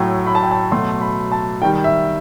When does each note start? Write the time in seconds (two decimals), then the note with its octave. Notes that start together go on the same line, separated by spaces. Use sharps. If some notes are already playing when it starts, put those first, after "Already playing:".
Already playing: A2 F#3 A3 G5
0.27 B5
0.35 A5
0.43 G5
0.51 A5
0.71 B2 F#3 A3 C6
1.01 B5
1.32 A5
1.62 D#3 G3 G5
1.84 E5